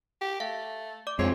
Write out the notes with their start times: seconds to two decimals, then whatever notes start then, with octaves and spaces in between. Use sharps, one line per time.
0.21 G4
0.40 A3 F5
1.07 D5 D6
1.19 F2 F3 G#3 C4 C#5